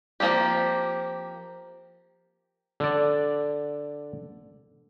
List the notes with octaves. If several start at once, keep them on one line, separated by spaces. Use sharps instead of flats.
F3 A#3 C4 G4
D3 D5